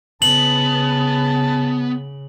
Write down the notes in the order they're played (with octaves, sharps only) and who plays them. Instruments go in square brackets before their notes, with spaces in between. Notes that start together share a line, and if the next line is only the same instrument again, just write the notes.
[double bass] C#3 [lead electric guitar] B3 [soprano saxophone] A5 [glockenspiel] F#7